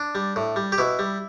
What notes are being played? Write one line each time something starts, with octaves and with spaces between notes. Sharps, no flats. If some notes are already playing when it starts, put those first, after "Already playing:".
Already playing: D4
G3
A2
G3
G4
B2 E4
G3